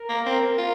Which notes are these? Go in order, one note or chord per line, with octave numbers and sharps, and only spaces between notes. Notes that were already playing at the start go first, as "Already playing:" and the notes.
Already playing: A#4
A#3
C4
F4